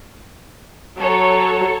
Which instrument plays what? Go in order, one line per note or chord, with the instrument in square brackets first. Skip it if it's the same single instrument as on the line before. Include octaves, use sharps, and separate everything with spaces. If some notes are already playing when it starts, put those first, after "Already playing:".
[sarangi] F#3 [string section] A4 C#5